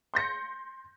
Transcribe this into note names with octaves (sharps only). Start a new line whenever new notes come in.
C6 G6 A#6 C#7